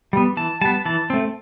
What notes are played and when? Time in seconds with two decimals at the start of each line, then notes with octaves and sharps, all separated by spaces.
0.13 G3 B3
0.37 E3 A5
0.61 G3 B3 A5
0.85 E3 A5
1.10 A3 C4